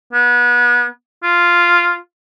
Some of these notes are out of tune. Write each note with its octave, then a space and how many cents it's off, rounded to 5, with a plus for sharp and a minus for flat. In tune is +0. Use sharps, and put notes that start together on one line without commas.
B3 -30
F4 -5